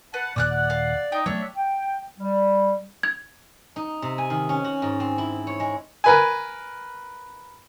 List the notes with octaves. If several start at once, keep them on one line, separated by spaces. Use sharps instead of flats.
B4 F#5 A5
D#2 A#2 D5 D6 F6 F#6
F#5
F5
D#4 G5
F#3 A3 B3 D4 C#5 E5
G5
G3
G#6
D#4
C3
G#5
D#3
C#4
F#4
G#2
C4
E4
C#5
G#3
A#4 B4 G#5